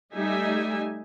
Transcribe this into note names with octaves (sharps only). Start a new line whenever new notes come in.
G3 A3 D#4 G4 E5 G#5